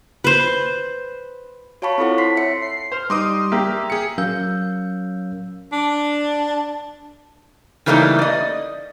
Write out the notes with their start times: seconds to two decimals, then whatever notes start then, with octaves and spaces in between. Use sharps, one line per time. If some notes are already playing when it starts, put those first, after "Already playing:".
0.24 B4 C5
1.82 F#4 C#5 F5 A5 B5 C#6
1.98 C4 E4 F4 A4 C5 F#5
2.18 C6 B6 C7
2.37 C#5 E5 C#7
2.61 C7
2.92 C5 F6
3.10 G3 D#4 C6 D6 D#6
3.52 A#3 G4 E5
3.90 G#4 C#7
4.18 F#3 C#4 A#4 F5 E6 G6
5.73 D4
7.86 C#3 E3 G3 A3 A#3 D#4
8.19 D5 D#5